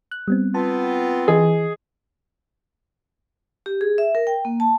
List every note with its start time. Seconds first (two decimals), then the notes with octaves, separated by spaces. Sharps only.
0.11 F#6
0.28 G3 B3 C4
0.55 B3 C4 F4 A5
1.28 E3 G#4 D#5
3.66 G4
3.81 G#4
3.98 E5
4.15 A#4
4.27 G5
4.45 A#3
4.60 A5